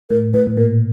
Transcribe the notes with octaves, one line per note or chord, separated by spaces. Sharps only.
A2 A#4
A2 B4
A2
A#2 A#4